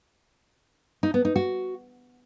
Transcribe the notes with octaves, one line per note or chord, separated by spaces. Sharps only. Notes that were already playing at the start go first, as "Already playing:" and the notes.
D#4
B3
D#4
F#4